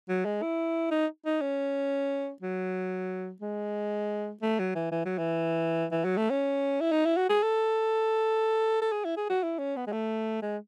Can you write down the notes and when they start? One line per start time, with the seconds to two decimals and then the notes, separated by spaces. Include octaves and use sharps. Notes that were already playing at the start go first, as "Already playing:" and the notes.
0.09 F#3
0.25 G#3
0.42 E4
0.91 D#4
1.26 D#4
1.41 C#4
2.42 F#3
3.42 G#3
4.42 A3
4.59 F#3
4.75 E3
4.92 E3
5.06 F#3
5.18 E3
5.92 E3
6.05 F#3
6.17 A3
6.31 C#4
6.81 E4
6.92 D#4
7.06 E4
7.17 F#4
7.29 G#4
7.43 A4
8.82 A4
8.92 G#4
9.05 E4
9.17 G#4
9.30 F#4
9.43 E4
9.59 C#4
9.76 B3
9.87 G#3
9.92 A3
10.42 G#3